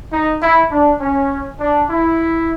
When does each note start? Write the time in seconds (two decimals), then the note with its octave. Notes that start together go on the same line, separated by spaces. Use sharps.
0.12 D#4
0.41 E4
0.71 D4
1.01 C#4
1.60 D4
1.90 E4